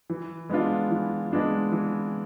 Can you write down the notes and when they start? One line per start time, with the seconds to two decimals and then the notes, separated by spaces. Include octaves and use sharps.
0.10 E3
0.49 G#3 B3 D4 F4
0.91 E3
1.32 G#3 B3 D4 F4
1.72 E3